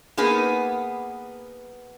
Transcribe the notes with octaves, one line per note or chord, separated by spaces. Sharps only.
A#3 B3 D#4 G#4 B4